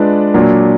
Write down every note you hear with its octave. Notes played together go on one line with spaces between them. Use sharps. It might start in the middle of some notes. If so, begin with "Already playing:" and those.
Already playing: G#3 D4 F4 B4 D5
A#2 F#3 D4